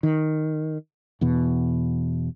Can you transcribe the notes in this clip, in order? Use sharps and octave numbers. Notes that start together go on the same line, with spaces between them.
D#3
E2 B2